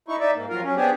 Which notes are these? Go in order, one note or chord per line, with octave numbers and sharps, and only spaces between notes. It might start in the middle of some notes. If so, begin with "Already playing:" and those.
D#4 E4 C#6
D#4 D5 E5
G#2 A#3
F2 F#3 F4 A#4
F#3 C#4
B3 C4 D4 G4 G#4